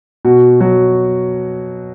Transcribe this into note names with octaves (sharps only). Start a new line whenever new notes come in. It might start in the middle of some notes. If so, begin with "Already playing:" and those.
B2 F#4
F#3 F#4